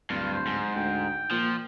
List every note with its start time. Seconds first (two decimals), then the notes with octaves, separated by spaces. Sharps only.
0.10 D1 G2 F4
0.33 C5
0.47 G#2
0.76 D2 G5
1.31 A#2 F3